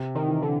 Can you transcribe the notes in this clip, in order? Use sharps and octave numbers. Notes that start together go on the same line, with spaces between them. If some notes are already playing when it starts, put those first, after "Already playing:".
Already playing: C3
D#3
E3
D3